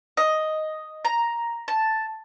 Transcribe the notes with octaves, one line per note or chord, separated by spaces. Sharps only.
D#5
A#5
A5